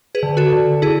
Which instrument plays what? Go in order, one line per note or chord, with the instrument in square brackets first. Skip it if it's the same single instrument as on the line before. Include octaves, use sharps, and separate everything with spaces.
[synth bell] G#4 B4
D3
F#4 A4
D3
D3 E4 G#4